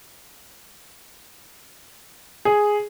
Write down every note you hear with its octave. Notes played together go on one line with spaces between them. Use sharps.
G#4